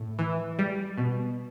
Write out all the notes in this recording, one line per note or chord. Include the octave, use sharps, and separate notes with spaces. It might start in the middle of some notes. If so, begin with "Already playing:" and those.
Already playing: A2
E3
G3
B2